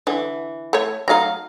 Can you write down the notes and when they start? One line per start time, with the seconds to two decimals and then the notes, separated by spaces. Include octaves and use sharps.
0.07 D3 E3
0.73 A3 C#5
1.08 F#3 A3 D#4 F5 A#5